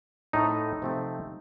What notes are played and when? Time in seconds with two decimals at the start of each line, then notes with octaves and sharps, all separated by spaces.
0.33 A2 A3 C4 D#4
0.82 C3 F3 A3 C4